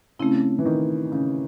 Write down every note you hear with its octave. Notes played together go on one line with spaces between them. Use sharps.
C#3 A3 C4 E4
E3
D#3
C#3